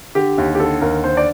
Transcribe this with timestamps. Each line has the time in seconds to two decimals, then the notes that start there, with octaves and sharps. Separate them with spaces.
0.15 D3 G4
0.38 D#2
0.55 G4
0.59 D3 A4
0.81 D#2 A#4
1.04 D3 C5
1.17 D5